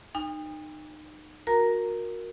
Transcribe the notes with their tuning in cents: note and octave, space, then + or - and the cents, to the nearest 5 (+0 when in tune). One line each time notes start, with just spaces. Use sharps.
D#4 -30 G5 +40
F#4 -25 A#4 +0 A#5 -5